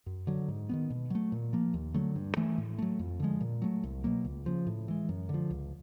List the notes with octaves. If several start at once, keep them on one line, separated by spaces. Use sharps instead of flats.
F#2
D3 F#3
G#2
D#3 F#3 B3
B2
F#3 A3
A#2
F3 A#3
D#2
D3 F#3 A3
G2
E3 A3
A2
F#3 A3
F2
D3 F3 G#3
A#2
F#3 A3
C2
B2 F#3 A#3
C#2
C#3 F3
A2
E3 G#3
F#2
D3
F3
C#2